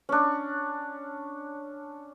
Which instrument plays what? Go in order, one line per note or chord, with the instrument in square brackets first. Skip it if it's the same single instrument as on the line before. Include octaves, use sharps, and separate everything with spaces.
[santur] C#4 D4